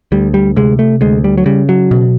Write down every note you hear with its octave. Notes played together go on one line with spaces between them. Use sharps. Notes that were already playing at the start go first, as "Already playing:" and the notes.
D2 G3
G3
C3 G#3
A3
D2 G#3
G3
F#3
C#3 G3
F#3
B2